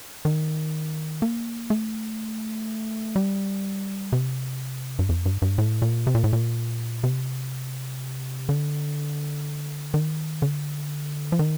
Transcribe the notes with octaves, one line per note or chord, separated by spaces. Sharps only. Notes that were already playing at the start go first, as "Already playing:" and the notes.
D#3
A#3
A3
G3
C3
G2
F2
G2
G2
A2
A#2
C3
A#2
A2
A#2
C3
D3
D#3
D3
F3
D#3